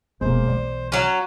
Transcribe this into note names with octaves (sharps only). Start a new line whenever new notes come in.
F1 B2 G#3 A#3 C5
B1 E3 D5
F#3 C#4